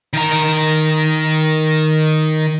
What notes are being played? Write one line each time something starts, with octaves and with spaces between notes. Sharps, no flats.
D#3 A#5